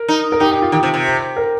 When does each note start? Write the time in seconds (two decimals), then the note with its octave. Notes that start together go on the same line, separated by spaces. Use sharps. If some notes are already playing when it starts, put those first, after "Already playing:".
Already playing: A#4
0.08 D#4
0.32 A#4
0.40 D#4 G4
0.51 G4
0.62 F4
0.72 D#3 G4
0.83 C3
0.94 C3
1.37 A#4